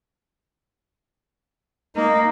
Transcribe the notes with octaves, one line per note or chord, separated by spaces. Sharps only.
A#3 D#4